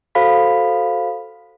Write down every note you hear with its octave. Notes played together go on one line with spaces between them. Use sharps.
F#4 A4 C5 F5 B5 B6